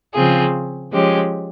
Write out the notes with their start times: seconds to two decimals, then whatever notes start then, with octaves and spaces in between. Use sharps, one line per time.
0.14 C#3 F3 C4 F4 G#4
0.91 F3 G#3 C#4 G4